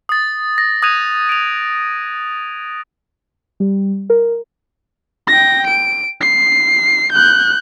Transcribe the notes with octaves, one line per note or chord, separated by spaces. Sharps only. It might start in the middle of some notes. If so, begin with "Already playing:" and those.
D#6 A6
A#6
D#6 F#6 G#6 D#7 F7
D7 F7
G3
A#4
G5 A#6
D7
C7
F#6 G6